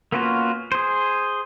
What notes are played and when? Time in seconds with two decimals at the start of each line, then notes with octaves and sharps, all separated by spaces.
0.12 A#3 B3 C#4 F4 F#4
0.72 G#4 C5